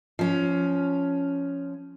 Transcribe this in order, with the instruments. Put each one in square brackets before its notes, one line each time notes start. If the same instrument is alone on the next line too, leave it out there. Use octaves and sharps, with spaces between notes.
[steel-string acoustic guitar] F3 C#4